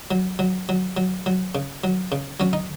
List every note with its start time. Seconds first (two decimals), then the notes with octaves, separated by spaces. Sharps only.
0.11 F#3
0.39 F#3
0.69 F#3
0.97 F#3
1.26 F#3
1.55 C#3
1.84 F#3
2.12 C#3
2.40 F#3 C#4
2.53 D#4